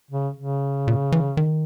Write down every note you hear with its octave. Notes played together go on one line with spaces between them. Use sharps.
C#3
C#3
A#2
E3
D#3